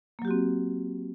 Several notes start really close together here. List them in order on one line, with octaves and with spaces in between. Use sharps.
A#3 F#3 G4 F#4 C4